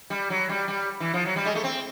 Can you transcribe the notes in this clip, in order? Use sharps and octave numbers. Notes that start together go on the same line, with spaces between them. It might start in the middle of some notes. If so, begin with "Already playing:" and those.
G3
F#3
G3
G3
E3
F3
F#3
G3
G#3
A3
C4